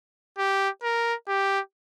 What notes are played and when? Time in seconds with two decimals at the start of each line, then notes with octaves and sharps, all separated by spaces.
0.38 G4
0.83 A#4
1.28 G4